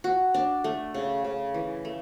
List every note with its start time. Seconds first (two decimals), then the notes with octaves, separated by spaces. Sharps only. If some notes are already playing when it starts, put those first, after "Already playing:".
0.04 F#4
0.34 D4
0.64 A3
0.94 C#3
1.25 C#3
1.54 E3
1.85 A3